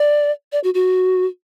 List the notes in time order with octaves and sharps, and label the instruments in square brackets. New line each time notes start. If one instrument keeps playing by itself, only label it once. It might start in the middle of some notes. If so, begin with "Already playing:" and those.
Already playing: [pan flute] D5
D5
F#4
F#4